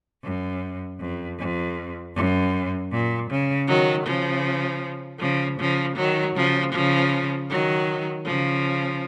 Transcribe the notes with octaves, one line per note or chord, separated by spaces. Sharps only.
F#2
F2
F2
F#2
A#2
C#3
D#3 F#3
C#3 F3
C#3 F3
C#3 F3
D#3 F#3
C#3 F3
C#3 F3
D#3 F#3
C#3 F3